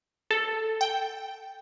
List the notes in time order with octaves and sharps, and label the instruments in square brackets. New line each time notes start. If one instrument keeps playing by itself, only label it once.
[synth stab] A4
G5